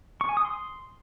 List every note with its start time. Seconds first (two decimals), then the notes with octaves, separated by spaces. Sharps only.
0.21 C#6
0.29 G#5
0.37 D#6
0.45 C6